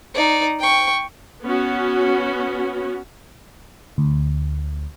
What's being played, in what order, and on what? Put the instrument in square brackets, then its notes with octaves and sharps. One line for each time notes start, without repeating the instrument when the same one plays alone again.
[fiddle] D#4 D5
G5 C#6
[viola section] B3 C#4 F#4
[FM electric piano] D2